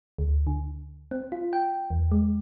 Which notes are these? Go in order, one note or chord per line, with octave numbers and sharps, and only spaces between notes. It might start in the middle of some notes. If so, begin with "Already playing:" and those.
D2
D3
C4
F4
G5
E2
G#3